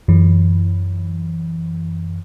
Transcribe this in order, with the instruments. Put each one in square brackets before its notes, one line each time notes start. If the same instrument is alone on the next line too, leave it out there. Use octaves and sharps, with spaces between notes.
[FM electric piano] F#2 E3